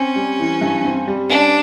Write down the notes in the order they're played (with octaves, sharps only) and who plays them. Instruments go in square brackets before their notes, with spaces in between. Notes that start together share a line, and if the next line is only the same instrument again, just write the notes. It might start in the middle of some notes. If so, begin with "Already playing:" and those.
Already playing: [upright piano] C4 [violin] C#4
[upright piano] G3
E3
G2
C4
G3
[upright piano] C#4 [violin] D4